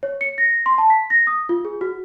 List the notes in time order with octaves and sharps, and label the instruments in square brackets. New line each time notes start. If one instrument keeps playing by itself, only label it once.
[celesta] C#5
C#7
A#6
C6
A5
B6
A#6
D#6
F4
G#4
F#4